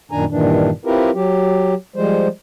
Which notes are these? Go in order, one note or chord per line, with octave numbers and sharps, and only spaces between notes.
F#2 A#2 D#3 D4 G#5 A#5
G2 A#2 D#3 E3 D4
C4 E4 F4 G4 A#4 B4
F#3 G4
F3 G3 G#3 C5